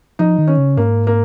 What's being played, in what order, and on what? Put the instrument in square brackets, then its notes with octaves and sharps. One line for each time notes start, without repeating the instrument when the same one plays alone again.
[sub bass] F3 [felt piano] D#4
[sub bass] D#3
[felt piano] C#4
[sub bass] C#3
[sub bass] G#2 [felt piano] A#3
[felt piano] A#3